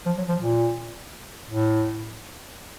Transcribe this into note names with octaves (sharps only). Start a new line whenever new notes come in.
F3
F#3
F3
A#2
A2